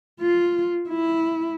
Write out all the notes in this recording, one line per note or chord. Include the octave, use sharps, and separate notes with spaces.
F4
E4